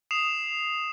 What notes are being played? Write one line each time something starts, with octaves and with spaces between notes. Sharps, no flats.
D#6 C7 E7 F7